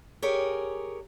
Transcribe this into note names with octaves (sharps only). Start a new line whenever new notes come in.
G4 G#4 A#4 C#5